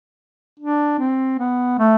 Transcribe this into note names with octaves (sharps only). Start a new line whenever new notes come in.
D4
C4
B3
A3